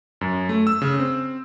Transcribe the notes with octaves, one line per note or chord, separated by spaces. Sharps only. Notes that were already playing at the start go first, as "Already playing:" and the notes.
F#2
A3
E6
C#3
C4